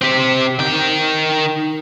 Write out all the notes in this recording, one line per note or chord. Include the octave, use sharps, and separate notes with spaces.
C4 G4
D#3 G5